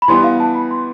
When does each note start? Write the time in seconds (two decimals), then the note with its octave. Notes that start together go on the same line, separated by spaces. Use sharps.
0.02 B5
0.08 E3 G3 B3 C6
0.24 F5
0.40 A5
0.55 B5
0.71 C6